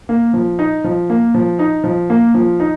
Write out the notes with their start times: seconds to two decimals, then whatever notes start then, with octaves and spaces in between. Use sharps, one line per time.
0.09 A#3
0.34 F3
0.59 D#4
0.84 F3
1.10 A#3
1.34 F3
1.59 D#4
1.84 F3
2.10 A#3
2.34 F3
2.60 D#4